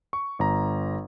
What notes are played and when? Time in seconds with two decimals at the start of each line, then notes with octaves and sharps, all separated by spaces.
0.13 C#6
0.39 G1 A#5